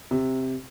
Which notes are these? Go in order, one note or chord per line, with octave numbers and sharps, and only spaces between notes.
C3